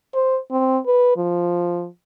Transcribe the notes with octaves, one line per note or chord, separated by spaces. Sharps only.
C5
C4
B4
F3